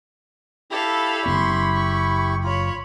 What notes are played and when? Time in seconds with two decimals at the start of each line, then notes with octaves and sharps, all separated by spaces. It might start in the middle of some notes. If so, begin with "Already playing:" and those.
0.71 E4 G4 A4 F5 B5
1.26 F#1 B3 C6 C#6
1.74 C#6
2.43 F4 C#5 B5